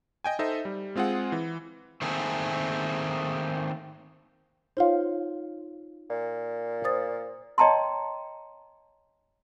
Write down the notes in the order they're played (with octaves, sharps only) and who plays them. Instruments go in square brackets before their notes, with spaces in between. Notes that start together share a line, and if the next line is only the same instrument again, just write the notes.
[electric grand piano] D#5 G5 G#5
D#4 A4 C5 D#5 E5
G3
G#3 C4 F4 G#4 F#5
E3
[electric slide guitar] D#3 A3 A#3 C4 G#4
[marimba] D#4 F4 C#5 [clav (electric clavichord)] C5 F5
[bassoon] A#2
[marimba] C5 D#6 A6
[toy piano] C#5 D#5 G5 A5 A#5 C6